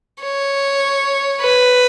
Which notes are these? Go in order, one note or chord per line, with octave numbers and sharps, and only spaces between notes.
C#5
B4